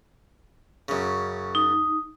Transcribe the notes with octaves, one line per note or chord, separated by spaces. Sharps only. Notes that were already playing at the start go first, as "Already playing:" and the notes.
F#2 C#3
D#4